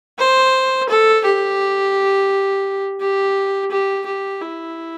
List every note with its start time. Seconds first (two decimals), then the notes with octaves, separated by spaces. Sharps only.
0.18 C5
0.89 A4
1.24 G4
3.00 G4
3.71 G4
4.06 G4
4.41 E4